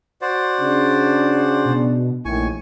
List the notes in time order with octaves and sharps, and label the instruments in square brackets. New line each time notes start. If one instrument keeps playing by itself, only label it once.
[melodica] F#4 C5 D5
[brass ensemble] C#3 D4
[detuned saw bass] B2
[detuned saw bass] A#1 [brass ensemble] A2 D#3 [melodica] G#5 C#6